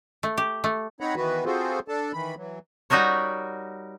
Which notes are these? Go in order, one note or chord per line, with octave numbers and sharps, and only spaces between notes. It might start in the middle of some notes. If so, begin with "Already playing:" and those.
A3
G4
A3
C4 D#4 C#5 F#5 A#5 B5
D#3 E3 B3 F#4 B4
C4 F4 F#4 G#4 A4 C5
D4 A4 A5
D#3 E3 B5
E3 F#3
G3 D#4 F#4 A#4 C#5